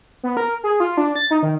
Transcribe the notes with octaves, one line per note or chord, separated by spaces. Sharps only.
B3
A#4
G#4
F4
D4
A6
D#4
D#3